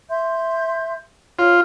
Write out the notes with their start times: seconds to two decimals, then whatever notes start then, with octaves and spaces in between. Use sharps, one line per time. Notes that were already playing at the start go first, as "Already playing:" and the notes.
0.09 E5 C6 G6
1.39 F4 C#5